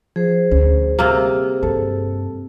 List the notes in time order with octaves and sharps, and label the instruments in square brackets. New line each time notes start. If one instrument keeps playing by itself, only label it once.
[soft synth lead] F3 [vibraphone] G#4 C5
[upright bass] D2 [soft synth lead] C#4
[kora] C3 A#3 [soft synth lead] G3
[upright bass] G2 [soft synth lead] A4